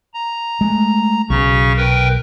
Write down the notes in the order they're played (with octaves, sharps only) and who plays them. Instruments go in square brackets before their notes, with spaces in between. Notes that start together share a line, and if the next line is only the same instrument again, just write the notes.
[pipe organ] A#5
[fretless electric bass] G#3 A3
[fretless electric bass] B1 [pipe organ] C#3 C#4 C#6
[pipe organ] A#4 B4 G5